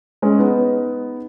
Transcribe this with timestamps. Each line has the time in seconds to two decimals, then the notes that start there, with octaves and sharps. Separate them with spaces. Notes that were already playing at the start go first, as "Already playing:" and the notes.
0.22 G#3 C#4
0.39 B3 D#4